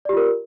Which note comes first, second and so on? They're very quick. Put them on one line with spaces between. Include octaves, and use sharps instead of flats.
D5 G4 F4 A#4